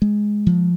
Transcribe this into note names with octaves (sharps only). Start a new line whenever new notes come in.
G#3
F3